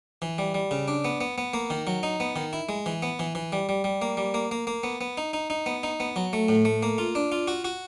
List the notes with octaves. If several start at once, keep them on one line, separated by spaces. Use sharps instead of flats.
E3
G3
G3
C#3
D4
B3
B3
B3
A#3
D#3
F#3
D#4
B3
D#3
E4
G#3
E3
B3
E3
E3
G3
G3
G3
A#3
G3
A#3
A#3
A#3
B3
B3
D#4
D#4
D#4
B3
D#4
B3
F#3
A3
A2
A3
A#3
F4
D4
F4
F#4
F#4